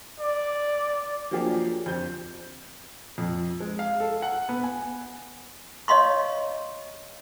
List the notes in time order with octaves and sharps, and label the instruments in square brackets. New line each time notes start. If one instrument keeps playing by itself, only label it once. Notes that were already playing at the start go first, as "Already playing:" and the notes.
[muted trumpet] D5
[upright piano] F3 F#3 A#3 D4 G4 G#4
F2 G6
[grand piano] F2
G#3
F5
A4
F#5
B3
G#5
[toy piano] C#5 D#5 F5 C6 C#6